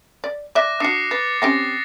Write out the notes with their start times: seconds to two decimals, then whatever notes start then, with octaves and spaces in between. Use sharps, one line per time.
0.24 D5
0.55 D5 E5 D6 F#6 A#6
0.80 D4 F#4 D#6 C7 C#7
1.11 B4 A6
1.42 C4 C#4 G4 A#6